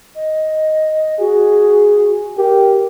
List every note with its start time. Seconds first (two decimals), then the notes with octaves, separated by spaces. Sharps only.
0.15 D#5
1.20 F#4 G#4
2.37 G4 A#4